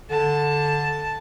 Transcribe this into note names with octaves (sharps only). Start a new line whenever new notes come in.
D3 A5